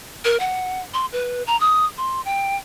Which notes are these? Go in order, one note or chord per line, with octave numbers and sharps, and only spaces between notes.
A#4
F#5
C6
B4
A#5
D#6
C6
G5